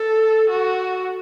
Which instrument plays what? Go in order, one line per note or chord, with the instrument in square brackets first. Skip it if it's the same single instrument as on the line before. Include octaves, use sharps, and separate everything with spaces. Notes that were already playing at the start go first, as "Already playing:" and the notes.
Already playing: [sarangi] A4
F#4